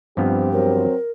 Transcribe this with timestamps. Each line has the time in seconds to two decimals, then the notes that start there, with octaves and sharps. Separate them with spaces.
0.17 G2 F3 B3 C4 G4
0.52 F#3 C4 A#4